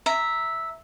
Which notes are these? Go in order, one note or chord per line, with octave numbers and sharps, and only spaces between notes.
E5 A#5